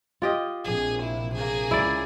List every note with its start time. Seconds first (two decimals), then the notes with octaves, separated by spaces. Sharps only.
0.22 F4 G4 D#5
0.65 A#1 C3 G#4
1.02 E4
1.34 A#3 G#4
1.71 C#2 E4 D5